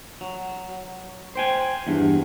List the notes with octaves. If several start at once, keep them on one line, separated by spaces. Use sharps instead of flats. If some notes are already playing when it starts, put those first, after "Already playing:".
F#3
C5 G5 G#5
E2 G2